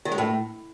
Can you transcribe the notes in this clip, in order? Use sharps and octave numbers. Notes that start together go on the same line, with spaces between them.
D#3
G#3
A2